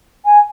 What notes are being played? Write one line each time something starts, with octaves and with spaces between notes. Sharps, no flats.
G#5